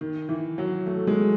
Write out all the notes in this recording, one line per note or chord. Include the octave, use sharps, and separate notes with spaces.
D#3
E3
F#3
A3
G#3